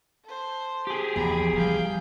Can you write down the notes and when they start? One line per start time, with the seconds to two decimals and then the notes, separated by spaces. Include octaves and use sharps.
0.25 A4 C5
0.87 G4 G#4
1.16 E2 F3 A#5 B5
1.53 E3 G3 F5 G5